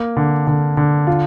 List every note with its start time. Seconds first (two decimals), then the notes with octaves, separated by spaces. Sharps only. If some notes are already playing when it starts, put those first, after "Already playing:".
Already playing: A#3
0.17 D3
0.47 D3
0.77 D3
1.07 F4